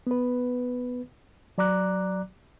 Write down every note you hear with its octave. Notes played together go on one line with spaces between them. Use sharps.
B3 B4
F#3 D5 A#5 D6 F#6